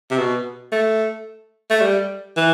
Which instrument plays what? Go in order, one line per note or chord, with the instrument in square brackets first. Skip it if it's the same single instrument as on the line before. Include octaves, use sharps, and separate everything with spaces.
[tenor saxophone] C3
B2
A3
A3
G3
E3